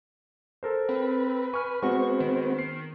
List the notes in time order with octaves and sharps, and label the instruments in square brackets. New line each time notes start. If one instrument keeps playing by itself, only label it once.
[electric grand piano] A4 A#4 C5
[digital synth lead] C4 [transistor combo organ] B4
[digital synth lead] G#5 [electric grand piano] C#6 F6
[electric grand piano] G#3 F#4 B4 [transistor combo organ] B3 C4 [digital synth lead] C#6
[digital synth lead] D#3
[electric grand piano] C7